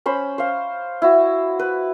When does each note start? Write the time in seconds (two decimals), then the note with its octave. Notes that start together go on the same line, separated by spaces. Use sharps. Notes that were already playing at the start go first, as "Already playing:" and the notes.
0.06 C#4 C5 B5
0.38 C5 F5
1.02 E4 F#4
1.59 B4